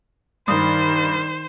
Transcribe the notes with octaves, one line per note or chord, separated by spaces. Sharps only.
G2 D#3 C5 B5 D#6